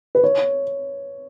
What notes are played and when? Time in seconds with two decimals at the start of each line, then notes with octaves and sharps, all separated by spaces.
0.15 B4
0.24 C#5